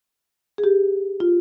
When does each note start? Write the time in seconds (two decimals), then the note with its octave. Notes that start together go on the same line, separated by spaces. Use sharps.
0.58 G#4
0.64 G4
1.20 F4